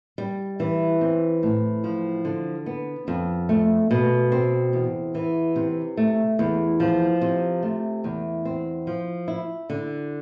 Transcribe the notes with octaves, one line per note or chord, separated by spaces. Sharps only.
G3
E3
C4
A2
F3
D3
B3
F2
A3
B2
C4
E2
E3
C3
A3
E2
F3
C3
A3
E2
C4
F3
E4
D3